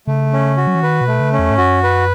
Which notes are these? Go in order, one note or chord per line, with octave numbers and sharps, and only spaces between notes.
C#3 A3
C#4
F#4
F#3
E3
D#3 B4
B2
A3
C#3
C#4
E2
G#2
F#2 F#4
B4